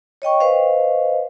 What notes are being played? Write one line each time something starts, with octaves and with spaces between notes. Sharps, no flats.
C#5 D#5 G5 C#6
B4 C5 D#5 F5